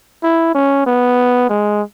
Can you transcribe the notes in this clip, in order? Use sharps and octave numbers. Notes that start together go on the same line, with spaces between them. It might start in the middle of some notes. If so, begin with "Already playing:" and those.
E4
C#4
B3
G#3